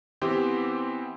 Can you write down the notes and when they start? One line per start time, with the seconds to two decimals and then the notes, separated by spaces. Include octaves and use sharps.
0.22 E3 B3 C4 G4 C5